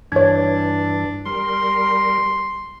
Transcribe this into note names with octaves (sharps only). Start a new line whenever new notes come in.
G2 E3 D4 C#5 G#6
G3 A#4 C6